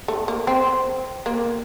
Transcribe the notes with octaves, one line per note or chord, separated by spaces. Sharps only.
A3
A#3
C4
A#3